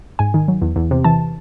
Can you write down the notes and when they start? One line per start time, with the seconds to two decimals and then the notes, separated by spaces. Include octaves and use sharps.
0.19 G#2 G#5
0.34 D#3
0.48 F#3
0.62 E2
0.76 E2
0.91 C3
1.04 E3 A5